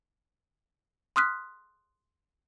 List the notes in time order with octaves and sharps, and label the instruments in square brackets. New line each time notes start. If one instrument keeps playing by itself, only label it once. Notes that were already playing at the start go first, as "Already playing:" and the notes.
[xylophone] C6 D#6 F6 F#6 B6